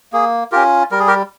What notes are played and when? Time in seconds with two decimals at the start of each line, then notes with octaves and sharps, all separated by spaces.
0.13 A#3 G#4
0.52 C#4 F4 G4 A#4
0.91 G3 A#4
1.00 G#4
1.07 G4 A#4